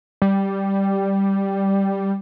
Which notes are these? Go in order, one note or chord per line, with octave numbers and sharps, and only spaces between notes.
G3